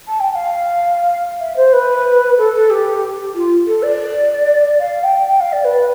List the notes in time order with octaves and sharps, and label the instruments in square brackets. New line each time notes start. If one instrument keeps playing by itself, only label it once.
[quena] A5
G5
G5
F5
E5
C5
B4
A4
A4
G4
F4
A4
D5
F5
G5
G5
F5
D5
B4